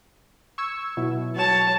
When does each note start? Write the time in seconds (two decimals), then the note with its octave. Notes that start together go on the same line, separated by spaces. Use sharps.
0.58 C#6 E6 G#6
0.97 B2 F#3 E4
1.36 F#3 C#5 A5 E7